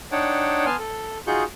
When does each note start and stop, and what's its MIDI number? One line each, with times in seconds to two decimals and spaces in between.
0.12 0.66 62
0.12 0.66 63
0.12 0.66 73
0.12 0.66 78
0.12 0.66 79
0.12 0.66 81
0.66 0.76 59
0.66 0.76 80
0.66 0.76 81
0.66 0.76 84
0.66 0.76 89
0.79 1.18 69
1.27 1.44 63
1.27 1.44 65
1.27 1.44 66
1.27 1.44 68
1.27 1.44 85
1.27 1.44 91